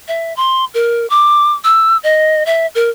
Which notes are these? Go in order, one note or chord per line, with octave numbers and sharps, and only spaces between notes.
E5
C6
A#4
D6
E6
D#5
E5
A#4